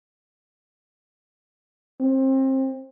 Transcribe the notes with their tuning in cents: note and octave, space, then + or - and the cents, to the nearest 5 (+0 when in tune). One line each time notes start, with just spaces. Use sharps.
C4 +25